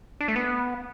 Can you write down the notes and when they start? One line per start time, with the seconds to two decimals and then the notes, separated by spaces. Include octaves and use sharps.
0.21 D4
0.28 A3
0.36 B3